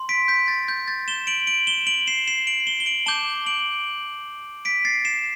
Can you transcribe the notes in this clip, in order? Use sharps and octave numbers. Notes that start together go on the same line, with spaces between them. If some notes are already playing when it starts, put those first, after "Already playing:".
Already playing: C6
B6 D7
G6 B6
A6
G6
A6
E7 G7
D7 F#7
D7 F#7
E7 G7
D7 F#7
C7 E7
C7 E7
D7 F#7
E7 G7
G7
D7 F#7
A5 D6 G6 E7 G7
D7 F#7
B6 D7
A6 C7
C7 E7